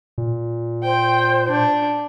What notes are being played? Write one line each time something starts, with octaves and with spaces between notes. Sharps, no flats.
A#2
C5 G5
D4